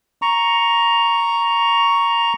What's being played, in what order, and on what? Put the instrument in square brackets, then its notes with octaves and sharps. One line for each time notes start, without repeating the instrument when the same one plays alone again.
[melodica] A#5 C#6